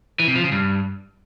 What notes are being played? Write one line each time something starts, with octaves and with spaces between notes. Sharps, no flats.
E3
C3
F3
C#3
G2